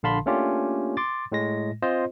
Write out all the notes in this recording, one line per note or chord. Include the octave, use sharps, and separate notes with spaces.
A#1 D3 F5 A5 B5 C6
A3 A#3 C#4 D4 F4 G4
C6 D6 A6
A2 G#3 A#6
C4 F4 C5 D#5